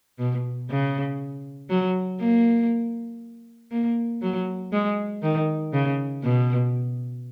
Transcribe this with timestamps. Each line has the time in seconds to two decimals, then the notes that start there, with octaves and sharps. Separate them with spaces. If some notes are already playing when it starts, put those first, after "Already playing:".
0.19 B2
0.70 C#3
1.70 F#3
2.20 A#3
3.71 A#3
4.22 F#3
4.72 G#3
5.23 D#3
5.73 C#3
6.23 B2